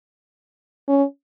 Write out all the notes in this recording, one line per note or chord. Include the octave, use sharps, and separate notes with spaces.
C#4